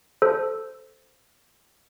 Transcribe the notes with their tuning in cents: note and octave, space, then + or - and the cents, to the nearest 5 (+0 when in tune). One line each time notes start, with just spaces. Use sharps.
A4 +0 C5 -10